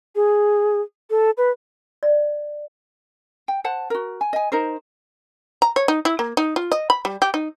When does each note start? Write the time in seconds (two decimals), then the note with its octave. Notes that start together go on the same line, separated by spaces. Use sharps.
0.16 G#4
1.10 A4
1.37 B4
2.03 D5
3.48 G5
3.64 C5 F#5 A5
3.90 F#4 A#4
4.21 G#5
4.33 D#5 G#5
4.52 D#4 A#4 C5
5.62 A#5
5.76 C#5
5.88 D#4
6.05 E4
6.19 A#3
6.37 D#4
6.56 F4
6.72 D#5
6.90 B5
7.05 G3
7.22 G4
7.34 D#4